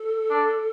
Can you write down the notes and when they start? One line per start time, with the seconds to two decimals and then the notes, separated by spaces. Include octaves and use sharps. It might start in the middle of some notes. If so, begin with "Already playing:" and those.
Already playing: A4
0.30 D4